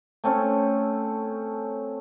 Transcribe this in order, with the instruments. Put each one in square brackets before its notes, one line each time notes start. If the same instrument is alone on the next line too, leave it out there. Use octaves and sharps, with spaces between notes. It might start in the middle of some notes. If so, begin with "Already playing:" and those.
[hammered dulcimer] A3 C4 C#4 A4